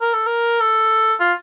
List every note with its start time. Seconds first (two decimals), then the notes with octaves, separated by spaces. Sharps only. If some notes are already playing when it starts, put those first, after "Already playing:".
0.01 A#4
0.14 A4
0.26 A#4
0.61 A4
1.20 F4